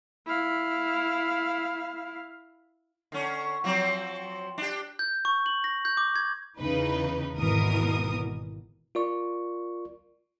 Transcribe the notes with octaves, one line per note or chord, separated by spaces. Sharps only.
E4 F5
D3 C#4
F3 F#3 C4
D4 G4
G6
C#6
F#7
A#6
G6
D6
G#6
E2 C#3 E3 D#4 B4
G#1 E2 B2 E3 A#4 D#6
F4 A#4 D5 C#6